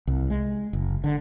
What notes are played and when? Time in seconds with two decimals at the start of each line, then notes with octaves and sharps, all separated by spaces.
0.07 C2
0.30 G#3
0.73 F#1
1.04 D3